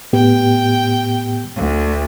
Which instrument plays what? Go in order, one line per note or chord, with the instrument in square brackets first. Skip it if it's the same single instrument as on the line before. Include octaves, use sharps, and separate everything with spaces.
[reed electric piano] A2 B3 G4 [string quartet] G5
[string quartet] D2